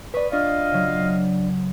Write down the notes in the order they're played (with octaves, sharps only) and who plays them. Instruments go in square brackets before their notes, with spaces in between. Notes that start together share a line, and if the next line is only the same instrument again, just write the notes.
[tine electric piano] B4 D5 [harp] B5 C#6 D#6
[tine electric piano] D4 D5 [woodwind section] F4 D#5 F5 [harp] C#6 A6
[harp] C#3 F#3